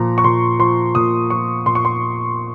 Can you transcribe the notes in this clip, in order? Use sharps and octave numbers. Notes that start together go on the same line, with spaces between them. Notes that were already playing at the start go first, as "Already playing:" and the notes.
Already playing: A#2 F3 A#5
C#6
A#2 C6
F3 C6
A#2 D#6
F3 C#6
A#2 C6
C#6
C6